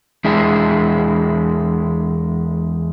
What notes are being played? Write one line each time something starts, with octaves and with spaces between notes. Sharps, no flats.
E2 G#3 D4 E4